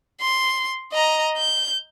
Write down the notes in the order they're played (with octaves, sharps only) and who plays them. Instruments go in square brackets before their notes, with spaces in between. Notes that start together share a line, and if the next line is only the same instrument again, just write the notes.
[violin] C6
D#5 A#5
G6